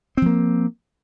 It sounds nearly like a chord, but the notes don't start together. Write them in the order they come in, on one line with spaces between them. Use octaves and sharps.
C4 F3 A#3